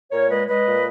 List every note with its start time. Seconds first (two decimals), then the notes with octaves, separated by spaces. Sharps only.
0.11 A#2 A#4 C#5
0.29 G#3 B4 D#5
0.47 G#3 B4 D#5
0.66 A#2